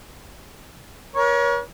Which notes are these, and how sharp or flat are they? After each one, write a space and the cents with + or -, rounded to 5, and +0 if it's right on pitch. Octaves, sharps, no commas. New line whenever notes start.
A#4 +45 C#5 +20